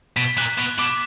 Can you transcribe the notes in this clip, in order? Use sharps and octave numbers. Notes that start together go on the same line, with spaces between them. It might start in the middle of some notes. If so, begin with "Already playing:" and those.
B2 B6
A#2 F#6
B2
B2 D6